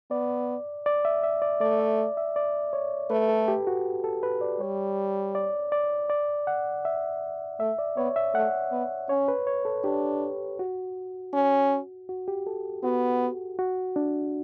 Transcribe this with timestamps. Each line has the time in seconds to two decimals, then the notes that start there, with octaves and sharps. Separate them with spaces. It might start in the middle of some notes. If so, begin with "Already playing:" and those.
0.11 B3 D5
0.86 D5
1.05 E5
1.23 E5
1.42 D5
1.61 A3 D5
1.79 E5
2.17 E5
2.36 D5
2.73 C#5
3.10 A3 B4
3.29 A4
3.48 G4
3.67 F#4
4.04 A4
4.23 B4
4.41 D5
4.60 G3 C#5
5.35 D5
5.72 D5
6.10 D5
6.47 F#5
6.85 E5
7.60 A3 E5
7.78 D5
7.97 B3 C#5
8.16 E5
8.34 A3 F#5
8.72 B3
9.09 C#4 C#5
9.28 B4
9.47 C#5
9.65 A4
9.84 D4 G4
10.59 F#4
11.34 C#4
12.09 F#4
12.28 G4
12.47 A4
12.84 B3 F#4
13.59 F#4
13.96 D4